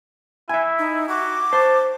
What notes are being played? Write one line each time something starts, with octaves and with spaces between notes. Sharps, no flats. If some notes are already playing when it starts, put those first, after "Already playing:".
E4 E5 G#5
D#4
F#4 D6
C5 A5